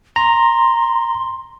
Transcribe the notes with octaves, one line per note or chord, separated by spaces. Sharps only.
A#5 C6